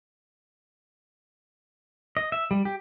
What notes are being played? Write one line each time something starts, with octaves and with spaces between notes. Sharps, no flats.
D#5
E5
G3
G4